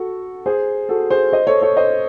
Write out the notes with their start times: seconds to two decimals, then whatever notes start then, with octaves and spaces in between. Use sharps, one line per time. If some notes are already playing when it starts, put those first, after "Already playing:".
Already playing: F#4 A4
0.46 G#4 C5
0.89 F#4 A4
1.10 G#4 C5
1.32 C5 D#5
1.47 A4 C#5
1.61 A4 C#5
1.77 C5 D#5